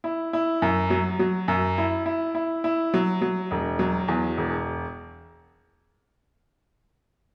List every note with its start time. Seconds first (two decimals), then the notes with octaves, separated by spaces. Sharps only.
0.04 E4
0.33 E4
0.62 F#2
0.90 F#3
1.19 F#3
1.48 F#2
1.78 E4
2.06 E4
2.35 E4
2.64 E4
2.94 F#3
3.21 F#3
3.51 E1
3.79 F#3
4.08 E2
4.37 E1